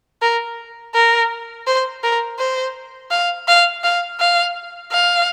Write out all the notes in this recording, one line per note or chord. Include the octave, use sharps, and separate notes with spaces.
A#4
A#4
C5
A#4
C5
F5
F5
F5
F5
F5